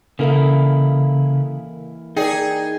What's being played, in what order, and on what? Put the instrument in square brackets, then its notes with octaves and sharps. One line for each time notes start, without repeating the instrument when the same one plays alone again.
[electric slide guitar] C#3 [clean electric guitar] E3 A#3 E4 [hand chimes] A4 A#4 F5
[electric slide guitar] D#4 [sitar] G#4 [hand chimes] A#4 D5 G5